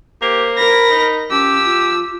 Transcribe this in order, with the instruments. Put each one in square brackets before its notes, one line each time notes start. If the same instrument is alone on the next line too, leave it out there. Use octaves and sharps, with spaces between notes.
[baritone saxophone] A#3 [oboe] G4 [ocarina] C5
[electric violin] A#4 A#6 [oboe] B5
[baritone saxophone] D#4
[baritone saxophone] F3 [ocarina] C#4 [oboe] G4 [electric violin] E6
[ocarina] F4